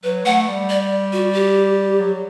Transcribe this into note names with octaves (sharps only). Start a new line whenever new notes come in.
F#3 B4
A3 F#5
G3
D5
F#4
G4
F#3